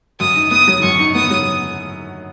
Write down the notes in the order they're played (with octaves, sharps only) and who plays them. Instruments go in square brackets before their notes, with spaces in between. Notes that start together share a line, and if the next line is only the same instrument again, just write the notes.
[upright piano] F#2 [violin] D#6
[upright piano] D#4
[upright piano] B3 [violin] D#6
[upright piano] F#3
[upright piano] F#2 [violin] C#6
[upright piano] D#4
[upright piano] B3 [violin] D#6
[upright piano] F#3